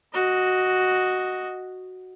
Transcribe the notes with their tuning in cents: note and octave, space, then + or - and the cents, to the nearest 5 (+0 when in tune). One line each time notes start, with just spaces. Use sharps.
F#4 +0 D#5 +0